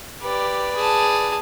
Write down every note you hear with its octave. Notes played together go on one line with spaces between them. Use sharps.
G4 B4 D5
G#4 A5